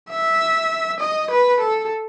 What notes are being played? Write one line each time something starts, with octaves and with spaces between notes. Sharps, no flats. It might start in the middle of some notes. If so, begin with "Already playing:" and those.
E5
D#5
B4
A4